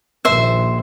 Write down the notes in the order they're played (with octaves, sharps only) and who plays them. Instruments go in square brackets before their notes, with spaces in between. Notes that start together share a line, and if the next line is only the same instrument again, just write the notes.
[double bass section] A#1 D#2 [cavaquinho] C5 E5